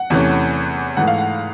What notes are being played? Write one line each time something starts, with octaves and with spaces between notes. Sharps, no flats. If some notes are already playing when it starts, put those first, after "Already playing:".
Already playing: F#5
E2 C3 E3 A3 C#4
G#2 E3 A3 F#5
F5
F#5